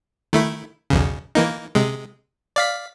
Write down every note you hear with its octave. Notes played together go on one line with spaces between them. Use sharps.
D#3 A3 E4
B1 E2 C#3
E3 A#3 D#4
C3 G#3
D5 F5 B6